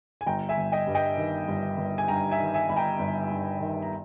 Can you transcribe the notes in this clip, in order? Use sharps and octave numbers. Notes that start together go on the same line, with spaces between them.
G#5
G1 G5 A#5
E5 G#5
G1
D#5 G5
G2
D#5 G5
D#3
G1
G1
G#5
G2 G5 A#5
E5 G#5
D#3
E5 G#5
G1 B5
G5 A#5
G1
G2
D#3
A#5